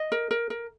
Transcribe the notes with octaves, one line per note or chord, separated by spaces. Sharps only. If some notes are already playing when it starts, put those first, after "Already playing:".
Already playing: D#5
A#4
A#4
A#4